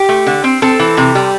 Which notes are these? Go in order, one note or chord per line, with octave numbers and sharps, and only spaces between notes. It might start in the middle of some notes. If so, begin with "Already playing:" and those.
Already playing: G4
A3
D3
C4
C4 A4
E3
C3
G3